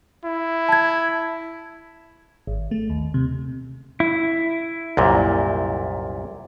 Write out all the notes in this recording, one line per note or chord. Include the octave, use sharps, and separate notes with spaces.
E4
A5 G#6
G#1
A3
D#2
C3
E4
C2 F#2 A#2